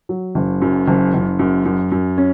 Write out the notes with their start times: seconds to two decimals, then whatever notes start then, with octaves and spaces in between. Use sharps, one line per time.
0.09 F#3
0.35 F#1
0.62 F#2
0.88 F#1
1.14 F#1
1.39 F#2
1.65 F#2
1.92 F#2
2.18 C#4